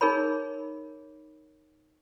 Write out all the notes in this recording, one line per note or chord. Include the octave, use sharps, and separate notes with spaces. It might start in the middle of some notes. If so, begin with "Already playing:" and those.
D#4 G#4 A#4 C#5 B5